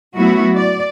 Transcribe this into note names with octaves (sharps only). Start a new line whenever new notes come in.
F#3 A3 B3 E4 F#4
D5